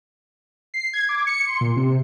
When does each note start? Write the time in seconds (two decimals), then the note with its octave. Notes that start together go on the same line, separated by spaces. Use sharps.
0.74 C7
0.93 G#6
1.09 D6
1.27 C#7
1.47 C6
1.61 A#2
1.76 C3